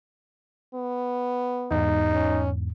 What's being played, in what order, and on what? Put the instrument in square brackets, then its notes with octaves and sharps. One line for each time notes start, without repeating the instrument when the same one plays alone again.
[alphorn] B3
[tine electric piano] E2 G#2 [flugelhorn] D#4
[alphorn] C#4